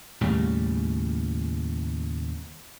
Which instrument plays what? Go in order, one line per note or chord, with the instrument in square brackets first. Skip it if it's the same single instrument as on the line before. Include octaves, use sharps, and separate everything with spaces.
[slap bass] D#2 A2 C#3 G3